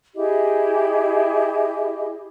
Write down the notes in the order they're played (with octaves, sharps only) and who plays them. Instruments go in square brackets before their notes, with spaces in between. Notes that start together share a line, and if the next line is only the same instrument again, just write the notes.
[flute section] E4 G4 G#4 D#5